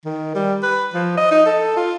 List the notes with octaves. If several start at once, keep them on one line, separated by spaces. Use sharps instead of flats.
D#3
G3
B4
F3
D#5
D#4
A4
F4